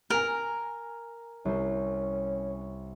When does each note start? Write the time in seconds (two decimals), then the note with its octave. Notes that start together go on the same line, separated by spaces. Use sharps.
0.10 A#4 G#5 A#5 F6
1.45 C2 C#4 C5